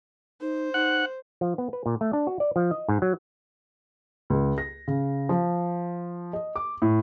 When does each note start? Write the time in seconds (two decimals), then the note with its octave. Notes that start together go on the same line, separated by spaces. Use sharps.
0.41 D#4 C5
0.74 D#4 F#5
1.41 F3
1.58 B3
1.73 B4
1.86 A#2
2.01 A3
2.13 D4
2.27 F#4
2.40 D5
2.56 F3
2.71 D#5
2.89 G#2
3.02 F#3
4.30 C#2
4.58 A#6
4.88 C#3
5.29 F3
6.33 D#5
6.56 D6
6.82 A2